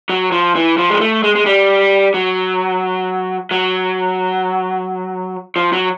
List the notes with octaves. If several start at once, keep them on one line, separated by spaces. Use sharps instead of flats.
F#3
F3
E3
F3
G#3
A3
G#3
G#3
G3
F#3
F#3
F3
F#3